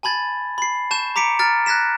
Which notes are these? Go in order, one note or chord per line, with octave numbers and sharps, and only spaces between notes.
G#5 A5 B5 G#6 A6
B5 C7
A5 C#6 G6 E7
A#5 D6 B6 C#7 D7
A#5 F6 A6 D7
F#6 G#6 A#6 B6 E7